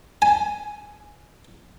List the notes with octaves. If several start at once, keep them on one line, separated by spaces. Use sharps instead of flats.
G#5